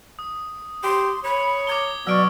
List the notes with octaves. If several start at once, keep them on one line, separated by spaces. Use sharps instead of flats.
D#6
G4 C6
C#5 B5
A#5 D6 G#6 G7
B2 F#3 D5 C#6 E6 F6 D7